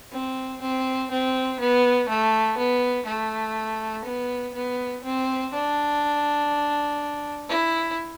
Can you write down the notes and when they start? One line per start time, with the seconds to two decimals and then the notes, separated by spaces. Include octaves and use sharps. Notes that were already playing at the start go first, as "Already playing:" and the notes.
0.12 C4
0.62 C4
1.11 C4
1.60 B3
2.09 A3
2.57 B3
3.07 A3
4.05 B3
4.55 B3
5.04 C4
5.53 D4
7.49 E4